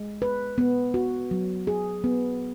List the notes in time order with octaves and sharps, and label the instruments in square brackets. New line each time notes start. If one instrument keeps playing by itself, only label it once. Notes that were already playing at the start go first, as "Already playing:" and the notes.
Already playing: [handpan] G#3
B4
B3
F#4
F#3
G#4
B3